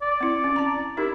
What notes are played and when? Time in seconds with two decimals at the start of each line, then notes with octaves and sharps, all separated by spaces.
0.02 D5
0.21 C4 E4
0.44 C#4
0.56 A5 A#5
0.97 D#4 E4 G4 A#4